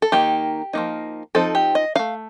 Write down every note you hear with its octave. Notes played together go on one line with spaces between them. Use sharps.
A4
D#3 A#3 D#4 G4
F3 A#3 D#4
F3 C4 D#4 A4
G4
D#5
A3 D#4 F5